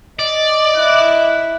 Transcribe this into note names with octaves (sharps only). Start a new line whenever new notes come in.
D5 D#5
E4 F#6